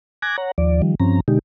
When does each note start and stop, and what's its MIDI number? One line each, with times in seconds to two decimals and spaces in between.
0.22 0.36 80
0.22 0.36 86
0.22 0.36 90
0.22 0.36 92
0.22 0.36 94
0.38 0.51 73
0.38 0.51 78
0.38 0.51 82
0.58 0.82 39
0.58 0.82 53
0.58 0.82 74
0.82 0.95 51
0.82 0.95 53
0.82 0.95 55
1.00 1.20 43
1.00 1.20 53
1.00 1.20 60
1.00 1.20 61
1.00 1.20 82
1.28 1.39 47
1.28 1.39 50
1.28 1.39 56
1.28 1.39 63
1.28 1.39 67